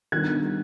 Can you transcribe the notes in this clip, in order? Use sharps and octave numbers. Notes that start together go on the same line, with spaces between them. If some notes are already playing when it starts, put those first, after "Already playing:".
D#3 G3 B3 D4 F#6 G#6